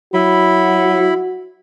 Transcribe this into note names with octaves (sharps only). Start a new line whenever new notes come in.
F#3 E4 F#4 B5